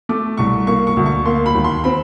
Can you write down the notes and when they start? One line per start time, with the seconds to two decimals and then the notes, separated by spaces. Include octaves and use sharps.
0.09 A3 D6
0.37 C2 C#6
0.67 A#3 C#6
0.87 C#6
0.97 D2
1.06 C#6
1.26 A#3 C6
1.46 B5
1.55 D#2
1.64 C6
1.84 C4 B5